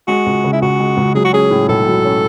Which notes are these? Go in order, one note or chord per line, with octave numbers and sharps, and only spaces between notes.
G#3 F#4
C#2
C#3
E4
C#2 F#4
G#3
C#2
F#3 G#4
F#4
C#4 G#4
A2
B1 A4
F#3
C#4